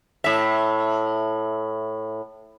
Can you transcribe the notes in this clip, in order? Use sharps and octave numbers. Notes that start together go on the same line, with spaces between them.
A2 E5